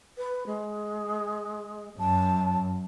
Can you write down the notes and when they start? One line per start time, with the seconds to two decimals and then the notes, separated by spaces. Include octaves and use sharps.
0.17 B4
0.46 G#3
1.99 F#2 A5